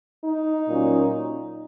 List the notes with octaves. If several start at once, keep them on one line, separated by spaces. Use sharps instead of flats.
D#4
A#2 F#3 C#4